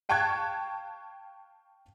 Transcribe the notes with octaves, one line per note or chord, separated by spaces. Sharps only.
F5 G5 A5 C#6 F#6 G#6